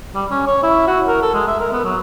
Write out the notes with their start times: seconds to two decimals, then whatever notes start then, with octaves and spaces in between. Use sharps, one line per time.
0.15 G3
0.31 C#4
0.47 C#5
0.63 E4
0.87 F#4
1.08 A#4
1.22 A4
1.34 G#3
1.47 E5
1.60 A#4
1.72 B3
1.84 F#3